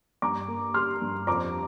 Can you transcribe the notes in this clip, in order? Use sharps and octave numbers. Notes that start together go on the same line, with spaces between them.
G2 A#5 D6
A#3
G3 C6 F6
G2
F2 A#5 D6